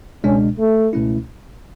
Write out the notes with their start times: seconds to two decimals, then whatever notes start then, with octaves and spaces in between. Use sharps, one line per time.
0.24 C#2 B2 G#3 C#4 D4
0.58 A3
0.93 C#2 B2 A3 C#4 E4